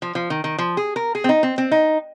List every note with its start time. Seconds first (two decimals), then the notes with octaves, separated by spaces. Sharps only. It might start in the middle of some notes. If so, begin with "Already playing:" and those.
0.02 F3
0.15 F3
0.30 D#3
0.44 D#3
0.58 F3
0.77 G#4
0.96 A#4
1.15 G#4
1.24 C4
1.29 D#4
1.43 C4
1.58 C4
1.71 D#4